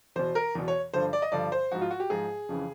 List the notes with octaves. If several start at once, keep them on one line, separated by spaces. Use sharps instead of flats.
E2 B2 C5
A#4
E2 B2
C#5
G2 D3 F3 C5
D5
D#5
G2 D3 F3 D5
C5
G#2 F3 F#4
F4
F#4
G4
G#2 F3 G#4
F2 C#3 E3